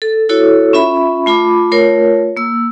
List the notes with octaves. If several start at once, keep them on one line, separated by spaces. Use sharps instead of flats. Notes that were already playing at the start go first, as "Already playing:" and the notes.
A4
E4 F#4 A4 C#5
C#4 F4 E5 B5
A3 F4 B5 D6
A3 F4 A#4 C#5
A#3 E6